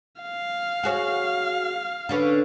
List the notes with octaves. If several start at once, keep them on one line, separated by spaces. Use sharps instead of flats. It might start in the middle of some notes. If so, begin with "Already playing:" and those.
F5
F#4 G#4 C#5
D3 C#4 B4